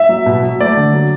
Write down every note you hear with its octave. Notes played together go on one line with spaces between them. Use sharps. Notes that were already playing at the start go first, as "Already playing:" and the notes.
Already playing: E5
F#3
B2
F#3
A3 D5
D3
F#3